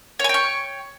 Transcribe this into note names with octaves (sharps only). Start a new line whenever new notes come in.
C#5 G5 G#5 C#6